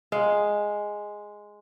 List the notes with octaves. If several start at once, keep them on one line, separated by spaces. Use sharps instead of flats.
G#3 F5